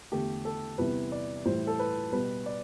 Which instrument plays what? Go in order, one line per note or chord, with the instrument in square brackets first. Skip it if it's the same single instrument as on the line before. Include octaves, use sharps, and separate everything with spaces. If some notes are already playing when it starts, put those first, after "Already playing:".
[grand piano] E2 D3 A3 G4
A4
E2 C3 E3 G3 B4
D5
A2 E3 G3 C5
A4
B4
B2 G3 B4
D5